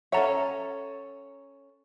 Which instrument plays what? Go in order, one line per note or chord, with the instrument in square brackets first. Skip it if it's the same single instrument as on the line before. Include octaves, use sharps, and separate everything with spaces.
[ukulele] C#4 A4 C#5 [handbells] E5 F#5 A#5